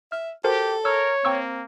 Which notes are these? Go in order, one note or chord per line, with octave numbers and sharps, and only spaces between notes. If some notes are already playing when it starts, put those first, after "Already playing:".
E5 F6
F#4 G4 A4 A#4 C5
A#4 C#5 E6 F6
A#3 C4 G5 C#6 E6